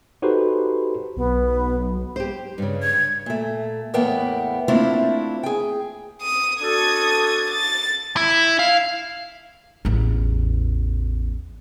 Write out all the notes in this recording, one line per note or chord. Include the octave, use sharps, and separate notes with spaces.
D#4 F#4 G4 A4 B4 C5
B1 B3
G4 C5
G2 C#3
G#6
A#2 A3
E2 A2 A#3 B3 E5 G5
A3 A#3 C4 D4 E4 F4
G#4 G5
D#6
D4 F#4 A4 D#6 G#6
A6
E4
F5
A1 E2